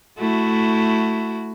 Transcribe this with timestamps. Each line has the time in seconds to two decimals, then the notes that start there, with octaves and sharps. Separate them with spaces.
0.18 A3 E4 F#4